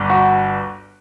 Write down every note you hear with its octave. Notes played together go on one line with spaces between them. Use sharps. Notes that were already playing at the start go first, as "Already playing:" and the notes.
Already playing: G1 G2
F#4